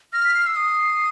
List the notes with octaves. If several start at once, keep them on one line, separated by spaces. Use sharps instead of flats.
F6 A#6
B6
C7
E6 C7
D#6